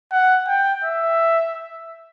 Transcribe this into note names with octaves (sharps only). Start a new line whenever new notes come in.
F#5
G5
E5